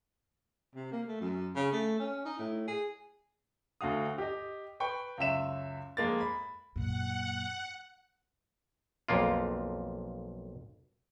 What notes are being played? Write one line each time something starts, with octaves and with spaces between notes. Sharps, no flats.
C3
A#3
A3
F#2
C#3
A3
C#4
D#4
A2
G#4
D2 D3 F#4 F5 D#6
G4 D#5
B4 G5 C#6
C#2 F#2 E5 E7
F2 G#3 A#3 A6
B5
F#2 A#2 F#5
B1 F2 A#3 F4